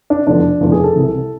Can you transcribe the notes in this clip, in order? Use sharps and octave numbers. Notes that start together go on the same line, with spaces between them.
D4
F1 E2 D3 F3 D4
F1 E2 D3 F3
G#4
A4
C2 C3 E3